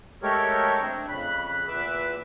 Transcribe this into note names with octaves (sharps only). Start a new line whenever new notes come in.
G#3 A3 G4 A4 A#4 C#5
A3 C4 D4
F2 C#3 B5 F#6
E2 A#2 B4 E5 D6 E6